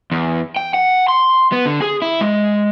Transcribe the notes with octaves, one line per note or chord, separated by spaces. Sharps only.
E2
G5
F#5
C6
B3
D3
G#4
E4
G#3